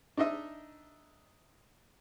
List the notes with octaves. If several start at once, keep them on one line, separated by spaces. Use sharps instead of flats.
D4 D#4 D#5 E5